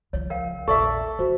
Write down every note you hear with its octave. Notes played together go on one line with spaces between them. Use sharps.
C#2 F3 C#5
A#4 F5 G5
A#1 E2 A4 D5 E5 C#6
D2 F#4 C5